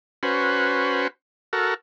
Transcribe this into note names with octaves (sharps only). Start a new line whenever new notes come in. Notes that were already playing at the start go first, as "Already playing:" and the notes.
C#4 F#4 B4 C5
F#4 A4 A#4